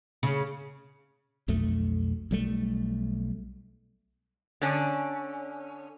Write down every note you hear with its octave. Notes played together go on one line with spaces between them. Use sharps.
C#3
B1 F2 A3
B1 G3 A3
D3 C#4 D4